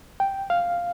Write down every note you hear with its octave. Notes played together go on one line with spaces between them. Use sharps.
G5
F5